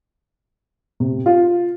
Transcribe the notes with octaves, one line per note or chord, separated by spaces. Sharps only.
C3
F4